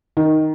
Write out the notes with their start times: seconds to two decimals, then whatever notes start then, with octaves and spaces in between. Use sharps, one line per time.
0.17 D#3